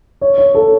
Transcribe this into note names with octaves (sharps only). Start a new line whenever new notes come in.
C#5
C#5
A4